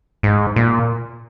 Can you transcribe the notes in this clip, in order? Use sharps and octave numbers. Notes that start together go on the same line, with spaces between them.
G#2
A#2